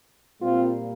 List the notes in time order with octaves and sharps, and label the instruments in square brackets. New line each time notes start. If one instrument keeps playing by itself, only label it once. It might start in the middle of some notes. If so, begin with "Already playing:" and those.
[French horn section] A#2 G3 A#3 C4 F4